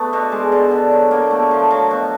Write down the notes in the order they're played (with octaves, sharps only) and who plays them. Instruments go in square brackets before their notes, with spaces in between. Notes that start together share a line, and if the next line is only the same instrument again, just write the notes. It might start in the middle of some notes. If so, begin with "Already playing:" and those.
Already playing: [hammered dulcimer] A3 B3 D4
B2
G#3
D3
D3
F#3
A#3
A3
F3
F#3
B2